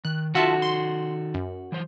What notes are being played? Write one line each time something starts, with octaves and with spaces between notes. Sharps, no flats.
D#3 F#6
D#3 D#4 F4 F#4 A4 E5 A5
C6
F#2
E3 F#3 C5